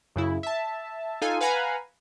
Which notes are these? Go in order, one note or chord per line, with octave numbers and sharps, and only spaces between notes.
F#2 C#3 E4
E5 A5
D#4 F4 A4 F5 G#5
B4 F5 F#5 G#5 A#5 B5